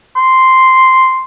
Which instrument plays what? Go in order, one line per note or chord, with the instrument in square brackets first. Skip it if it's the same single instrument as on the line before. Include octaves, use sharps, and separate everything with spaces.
[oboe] C6